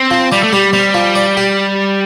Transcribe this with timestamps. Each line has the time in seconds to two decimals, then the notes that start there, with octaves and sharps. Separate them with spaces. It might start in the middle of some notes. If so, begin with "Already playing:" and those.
Already playing: C4
0.11 F3
0.32 G3 D5
0.43 A3
0.53 G3 G4
0.73 G3 C4
0.94 F3
1.15 D5
1.37 G4